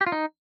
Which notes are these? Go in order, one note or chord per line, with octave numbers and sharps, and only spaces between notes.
G4
F4
D#4